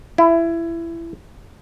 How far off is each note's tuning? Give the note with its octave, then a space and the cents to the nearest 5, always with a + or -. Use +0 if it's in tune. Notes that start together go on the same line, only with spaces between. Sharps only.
E4 +20